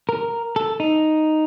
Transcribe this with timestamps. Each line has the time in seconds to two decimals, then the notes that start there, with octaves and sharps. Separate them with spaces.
0.09 A#4
0.56 A4
0.80 D#4